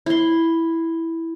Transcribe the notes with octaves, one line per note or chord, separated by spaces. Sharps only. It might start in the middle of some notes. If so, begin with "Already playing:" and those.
E4 C6